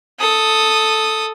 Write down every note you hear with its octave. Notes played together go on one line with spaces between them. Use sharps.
A4 D#6